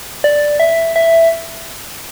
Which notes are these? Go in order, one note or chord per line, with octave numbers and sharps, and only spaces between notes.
D5
E5
E5